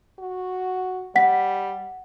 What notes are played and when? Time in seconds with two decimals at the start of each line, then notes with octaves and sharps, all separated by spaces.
0.19 F#4
1.16 G3 F#5 B6